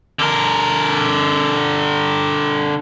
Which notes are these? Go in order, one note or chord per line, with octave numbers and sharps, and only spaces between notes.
D3 A#4